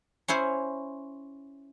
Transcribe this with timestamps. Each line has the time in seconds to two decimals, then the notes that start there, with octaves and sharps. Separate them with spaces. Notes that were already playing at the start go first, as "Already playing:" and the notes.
0.28 C#4 E4 C5 C#5